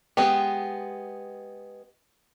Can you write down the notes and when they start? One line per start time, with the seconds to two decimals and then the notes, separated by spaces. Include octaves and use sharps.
0.17 G#3 B3 G4